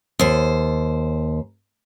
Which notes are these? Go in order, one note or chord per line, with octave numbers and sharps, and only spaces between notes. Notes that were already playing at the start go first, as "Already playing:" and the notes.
D#2 C5